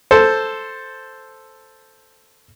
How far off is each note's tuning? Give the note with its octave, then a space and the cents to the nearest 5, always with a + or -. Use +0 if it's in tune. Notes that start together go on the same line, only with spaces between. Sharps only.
A4 +0 C5 +0